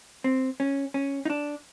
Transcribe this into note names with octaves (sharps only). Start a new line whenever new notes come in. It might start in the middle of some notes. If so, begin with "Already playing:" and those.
C4
C#4
C#4
D#4
D4